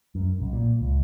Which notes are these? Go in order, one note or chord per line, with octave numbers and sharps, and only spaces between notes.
F#2
B1
A#2
C#2